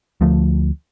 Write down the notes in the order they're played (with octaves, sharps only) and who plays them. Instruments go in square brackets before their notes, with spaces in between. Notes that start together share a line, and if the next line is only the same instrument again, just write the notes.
[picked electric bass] D2 F3 A3